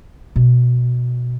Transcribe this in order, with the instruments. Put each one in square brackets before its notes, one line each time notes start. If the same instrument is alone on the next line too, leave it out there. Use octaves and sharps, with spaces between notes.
[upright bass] B2